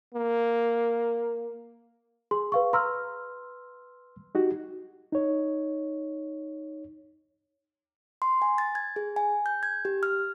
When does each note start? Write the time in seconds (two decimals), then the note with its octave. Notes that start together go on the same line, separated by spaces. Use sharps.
0.14 A#3
2.31 G#4 C6
2.52 B4 F5 C#6
2.73 B4 A#5 C6 E6 F6
4.35 D#4 F#4 G4
5.12 D#4 C#5
8.22 C6
8.42 G#5
8.58 A6
8.75 G#6
8.96 G#4
9.16 G#5
9.46 G6
9.63 G#6
9.85 G4
10.03 F6